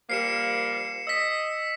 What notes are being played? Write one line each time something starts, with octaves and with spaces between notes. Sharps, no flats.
F3 G3 A#3 C7 C#7 E7
D#5 E6 B6